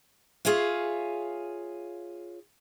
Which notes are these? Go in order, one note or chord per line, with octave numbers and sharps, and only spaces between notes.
F4 G#4 C#5 E5 F5